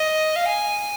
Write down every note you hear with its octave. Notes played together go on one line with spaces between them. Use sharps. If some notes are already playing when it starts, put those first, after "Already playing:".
Already playing: D#5
F5
G#5